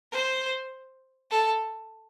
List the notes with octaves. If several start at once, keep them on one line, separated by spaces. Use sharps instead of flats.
C5
A4